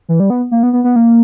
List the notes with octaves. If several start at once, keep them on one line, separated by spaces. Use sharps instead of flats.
E3
G3
B3
A#3
B3
B3
B3
A#3